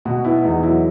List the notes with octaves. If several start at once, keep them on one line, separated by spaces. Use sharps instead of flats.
B2 F#4
B3 E4
E2 D#4
F#3 E4